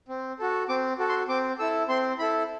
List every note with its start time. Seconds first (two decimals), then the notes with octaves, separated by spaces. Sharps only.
0.08 C4
0.39 F#4 A4
0.69 C4 D6
0.98 F#4 A4
1.09 C6
1.29 C4 D6
1.59 E4 A4 E6
1.89 C4 C6
2.19 E4 A4 B5